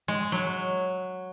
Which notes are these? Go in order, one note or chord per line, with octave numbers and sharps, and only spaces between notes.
G#3
F#3